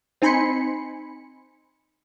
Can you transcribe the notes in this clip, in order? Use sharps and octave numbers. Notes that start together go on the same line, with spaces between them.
C4 D#4 G#5 B5 C6 C#7